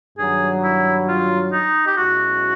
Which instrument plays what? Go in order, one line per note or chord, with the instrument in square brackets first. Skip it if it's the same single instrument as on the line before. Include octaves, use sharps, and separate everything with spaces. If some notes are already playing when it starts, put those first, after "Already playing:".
[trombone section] G2 D#3 F#3 [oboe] G#4
[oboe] E4
F4
D#4
G4
[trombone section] B1 B2 G#3 C#4 E4 [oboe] F#4